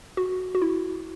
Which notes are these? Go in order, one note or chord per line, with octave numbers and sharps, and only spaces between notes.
F#4
F#4
E4